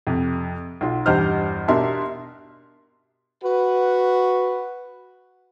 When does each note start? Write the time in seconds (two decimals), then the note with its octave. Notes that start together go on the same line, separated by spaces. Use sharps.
0.07 F2 C3
0.81 B1 F4
1.06 E2 G2 G4 C5 D#5 F6
1.68 B2 D4 G4 A#4 E5 C6
3.44 F#4 B4